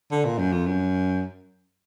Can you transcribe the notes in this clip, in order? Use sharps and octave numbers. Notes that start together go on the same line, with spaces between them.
D3
A#2
F#2
F2
F#2